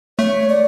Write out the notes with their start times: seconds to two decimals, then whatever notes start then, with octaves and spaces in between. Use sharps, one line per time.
0.19 A3 C#5
0.49 D5